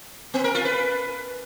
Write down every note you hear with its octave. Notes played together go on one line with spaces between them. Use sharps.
B3
A#4
F4
B4